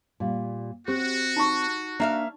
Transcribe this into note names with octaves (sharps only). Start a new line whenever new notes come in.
A#2 G3
C4 F#4 G4
D#4 A5 C#6
A#3 D4 E5 F5